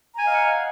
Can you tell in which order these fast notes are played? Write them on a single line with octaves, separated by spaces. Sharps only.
A#5 G#5 D#5 F5 F#5